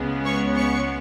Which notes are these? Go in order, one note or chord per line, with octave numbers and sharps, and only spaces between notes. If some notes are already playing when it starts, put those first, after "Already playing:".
Already playing: C#2 C#3 G#3 B3
C#5 C#6
C#5 C#6